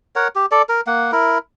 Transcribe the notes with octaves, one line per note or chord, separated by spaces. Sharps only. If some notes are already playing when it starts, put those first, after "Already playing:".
A#4 C#5 F#5
G4
A4 D5
A#4
A#3 F#5
E4 A#4